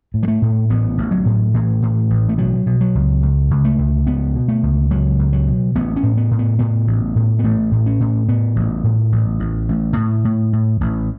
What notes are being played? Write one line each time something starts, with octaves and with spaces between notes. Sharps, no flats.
A2
F#3
A3
A2
A1 B3
A1
F#3
A2
A2 E3
A2
A1
A3
B2 F#3
B2
F#3
C#2
C#2
C#2
A3
C#2
C#2 B3
B2
A3
C#2
C#2 F#3
C#2
F#3
B2
A1 B3
C#4
A2
B3
A2
B3
A2 B3
A1
A2
B3
A1 A3
A2
C#4
A2
A2 B3
A1
A2
A1
A1
A1
A2
A2
A2
A1